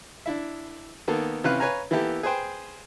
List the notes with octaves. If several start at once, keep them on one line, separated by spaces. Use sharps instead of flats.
D4 E4 E5
D#3 A#3 B3 A4
C3 E3 C#4 B4 F5 F#6
B4 C#5 F5 G#5 A#5
E3 A#3 B3 E4 G4 A4
G#4 B4 C5 G5